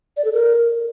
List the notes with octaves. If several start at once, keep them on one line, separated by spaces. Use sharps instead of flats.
D5
A4
A#4